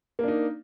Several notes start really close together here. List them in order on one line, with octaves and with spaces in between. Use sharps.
A#3 D4 D#4